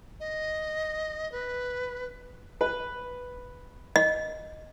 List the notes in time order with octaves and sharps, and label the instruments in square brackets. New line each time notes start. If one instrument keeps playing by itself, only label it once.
[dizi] D#5
B4
[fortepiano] B4
[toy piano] D#5